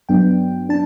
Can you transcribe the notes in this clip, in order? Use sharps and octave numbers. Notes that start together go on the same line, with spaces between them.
G2 F#3 B3 D4 G5
D4 A5